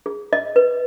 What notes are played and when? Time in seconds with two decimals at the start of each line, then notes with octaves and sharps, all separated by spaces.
0.06 G#4
0.33 D#5
0.56 B4